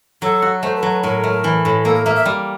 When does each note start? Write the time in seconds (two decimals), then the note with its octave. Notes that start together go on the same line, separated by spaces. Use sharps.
0.22 F#3 A4
0.42 F#4
0.63 A3 C5
0.76 B4
0.83 F#3
0.90 B4
1.03 A2 A#4
1.24 A3
1.44 E3
1.65 A2
1.85 A#3 A4
1.95 A#4
2.05 A#3 E5
2.16 E5
2.25 G3